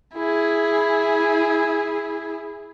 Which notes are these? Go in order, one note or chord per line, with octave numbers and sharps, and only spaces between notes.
E4 G#4